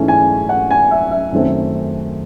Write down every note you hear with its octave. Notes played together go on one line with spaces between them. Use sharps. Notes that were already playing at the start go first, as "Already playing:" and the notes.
Already playing: G#2 E3 A3 C#4
G#5
F#5
G#5
E5
E5
F#2 D#3 A3 C4